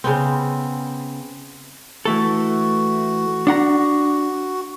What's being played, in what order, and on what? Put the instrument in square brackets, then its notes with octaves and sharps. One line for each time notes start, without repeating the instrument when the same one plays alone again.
[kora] C#3 B3 C4
[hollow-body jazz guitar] E3 A3 A4 [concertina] F#4
[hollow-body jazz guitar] D4 F#5 A#5